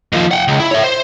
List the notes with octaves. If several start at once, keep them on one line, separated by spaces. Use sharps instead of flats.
D#2 F3
F#5 G5
C#2
E4
C#5 E5
C5